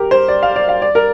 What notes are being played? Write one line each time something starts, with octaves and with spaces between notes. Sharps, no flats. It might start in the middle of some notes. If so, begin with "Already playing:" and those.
Already playing: G4 A#4
C5
D5
F5
D5
F5
D5
A#4